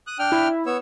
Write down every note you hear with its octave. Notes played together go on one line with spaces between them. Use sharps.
D#6 F#6
D4 G5 F6
E4
B3 C#5 E6